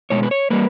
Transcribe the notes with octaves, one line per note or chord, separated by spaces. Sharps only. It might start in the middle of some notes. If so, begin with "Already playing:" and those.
B2 G#3 C#5
B4
C#5
G3 A#3 B4